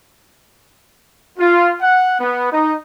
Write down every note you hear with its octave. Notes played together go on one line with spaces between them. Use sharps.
F4
F#5
B3
D#4